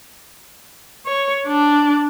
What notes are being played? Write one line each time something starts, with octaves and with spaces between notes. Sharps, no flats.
C#5
D4